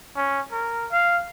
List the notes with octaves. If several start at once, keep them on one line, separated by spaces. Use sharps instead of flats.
C#4
A#4
F5